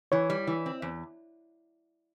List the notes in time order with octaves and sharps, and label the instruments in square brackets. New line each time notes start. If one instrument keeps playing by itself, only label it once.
[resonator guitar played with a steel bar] E3 [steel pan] C#5
[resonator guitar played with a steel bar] G3
E3
C4
E2